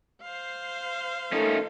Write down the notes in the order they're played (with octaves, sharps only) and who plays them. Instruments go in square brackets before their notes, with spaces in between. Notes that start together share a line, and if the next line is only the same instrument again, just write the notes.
[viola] C5 F5
[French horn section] D#3 A3 [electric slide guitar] C#4 D#4 F4